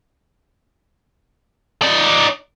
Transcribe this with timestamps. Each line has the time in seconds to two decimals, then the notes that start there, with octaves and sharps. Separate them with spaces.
1.82 D#4 D5